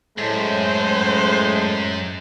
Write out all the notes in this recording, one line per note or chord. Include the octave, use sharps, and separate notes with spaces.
F#2 A2 G#3 A3 C5